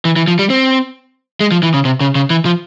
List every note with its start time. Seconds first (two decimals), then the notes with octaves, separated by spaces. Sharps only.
0.05 E3
0.16 E3
0.28 F3
0.39 G3
0.50 C4
1.40 G#3
1.52 F3
1.63 E3
1.74 C#3
1.85 C3
2.01 C#3
2.15 C#3
2.30 E3
2.45 F3